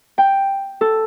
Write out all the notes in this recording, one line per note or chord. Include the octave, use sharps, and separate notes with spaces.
G5
A4